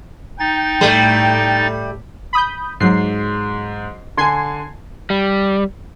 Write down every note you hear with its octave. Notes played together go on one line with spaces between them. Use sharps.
D#4 G5 A6
A2 G3 A3
B5 D#6 G6
G#2 F#3 C7
D3 G#5 C6 G#6 C7
G3